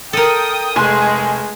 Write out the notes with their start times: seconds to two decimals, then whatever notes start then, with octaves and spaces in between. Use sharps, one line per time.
0.13 A4 A#4 G5 D#6
0.76 F1 G#3 G#4 G#5 C6